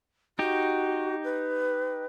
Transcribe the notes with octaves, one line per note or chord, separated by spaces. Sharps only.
D#4 F#4 G4
B4